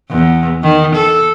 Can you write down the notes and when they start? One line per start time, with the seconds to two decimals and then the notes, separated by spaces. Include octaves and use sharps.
0.11 E2
0.63 D#3
0.95 A4